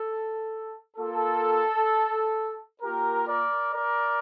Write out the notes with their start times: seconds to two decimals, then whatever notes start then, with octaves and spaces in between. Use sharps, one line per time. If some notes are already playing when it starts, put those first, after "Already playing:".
Already playing: A4
0.97 A#3 F4 A4
2.81 A#3 F4 G4 A#4
3.27 A#4 D5
3.74 A#4 D5